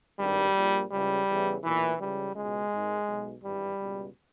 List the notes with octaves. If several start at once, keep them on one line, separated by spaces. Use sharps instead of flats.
G#1 G2 D#3 G3
A#1 A#2
C#2 C#3 E3 G3
E2 C#3 E3
B1 A#2 E3
C#2 C#3 E3 G3
C#2 B2 G#3
G#1 G#2 D#3
B1 B2
G#1 G2 E3 G3
C#2 B2